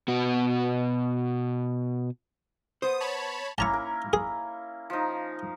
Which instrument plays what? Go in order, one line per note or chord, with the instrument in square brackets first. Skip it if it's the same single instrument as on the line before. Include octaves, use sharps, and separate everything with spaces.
[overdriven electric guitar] B2 F#4
[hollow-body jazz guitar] B3 C5 [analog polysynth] D#6
[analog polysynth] C#5 A5 B5
[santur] A#3 C#4 E4 [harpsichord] A5 A#5 C#6
[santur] A#4
[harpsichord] G#4
[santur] F3 D#4